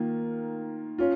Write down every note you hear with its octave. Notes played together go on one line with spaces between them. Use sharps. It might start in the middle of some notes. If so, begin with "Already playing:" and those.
Already playing: D#3 A#3 F4
C#4 F4